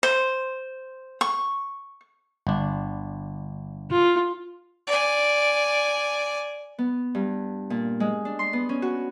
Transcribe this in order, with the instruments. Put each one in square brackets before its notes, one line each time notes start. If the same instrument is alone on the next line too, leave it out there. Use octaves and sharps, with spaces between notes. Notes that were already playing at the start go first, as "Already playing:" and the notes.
[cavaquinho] C5
C#6
[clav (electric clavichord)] G1 D4
[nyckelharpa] F4
[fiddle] D5 G#5
[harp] B3
G2
A#2
G#3
D4
C6
B3
C#4
F#4